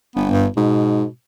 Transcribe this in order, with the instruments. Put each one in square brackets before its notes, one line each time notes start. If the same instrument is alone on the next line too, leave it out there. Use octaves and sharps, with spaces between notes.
[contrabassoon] G1 [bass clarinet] B3
[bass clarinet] G2
[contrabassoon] G#2 [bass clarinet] B2